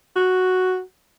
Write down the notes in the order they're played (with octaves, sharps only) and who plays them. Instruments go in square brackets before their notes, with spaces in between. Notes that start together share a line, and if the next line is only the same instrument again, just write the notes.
[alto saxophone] F#4